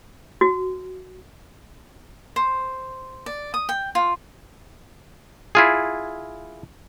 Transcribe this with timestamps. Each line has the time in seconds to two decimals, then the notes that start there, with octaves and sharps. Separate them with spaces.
0.41 F#4
2.36 C5
3.26 D5
3.54 D#6
3.69 G5
3.95 F4
5.55 E4 F4 G#4